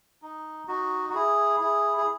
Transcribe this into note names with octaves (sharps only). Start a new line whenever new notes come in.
D#4
D#4 F#4
F#4
E4 G#4
E4 G#4
G#4